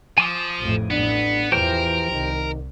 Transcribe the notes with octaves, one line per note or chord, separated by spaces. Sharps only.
F3 G#5 D6 D#6
A1 F2 A2
A1 A2 B3 D4
E2 E3 F3 G4 A#4 C5 G5
C2 D#3